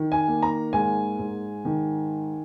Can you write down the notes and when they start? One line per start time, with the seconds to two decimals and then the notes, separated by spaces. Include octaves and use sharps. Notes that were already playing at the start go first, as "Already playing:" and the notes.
Already playing: D#3
0.12 G#5
0.28 A#3
0.43 A#5
0.73 G#2 G#5
1.19 G#2
1.65 D#3